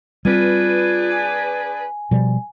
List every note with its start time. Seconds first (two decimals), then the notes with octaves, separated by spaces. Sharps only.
0.25 G3 C4 D4 F4 G#4 B4
1.11 G#5
2.11 B2 F3 G3